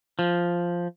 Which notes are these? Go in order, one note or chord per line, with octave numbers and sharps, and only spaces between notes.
F3